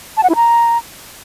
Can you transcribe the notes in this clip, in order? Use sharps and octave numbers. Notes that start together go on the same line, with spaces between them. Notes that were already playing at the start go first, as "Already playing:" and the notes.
A5
F#5
E4
A#5